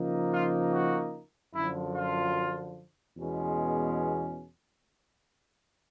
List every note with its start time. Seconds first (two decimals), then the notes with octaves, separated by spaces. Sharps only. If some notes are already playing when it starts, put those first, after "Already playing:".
Already playing: C#3 F3 A#3 D#4
0.31 F4
0.72 F#4
1.54 F#2 D3 F3 E4
1.94 F4
3.16 E2 B2 G#3 C#4